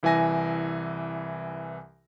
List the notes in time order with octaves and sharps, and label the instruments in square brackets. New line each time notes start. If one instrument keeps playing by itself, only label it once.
[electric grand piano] C2 E3 E5 G#5 A#6